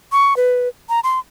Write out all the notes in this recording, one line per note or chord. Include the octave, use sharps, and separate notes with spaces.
C#6
B4
A#5
C6